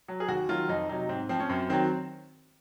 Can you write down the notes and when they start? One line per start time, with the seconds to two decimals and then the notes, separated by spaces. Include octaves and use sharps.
0.08 F#3
0.20 G#4
0.28 D#2 F#4
0.49 D#3 F#3 F4
0.69 F2 D#4
0.89 C3 F#3 D#4
1.09 G#2 C4
1.29 F3 C4
1.40 C#4
1.49 F#2 C4
1.69 D#3 F#3 C4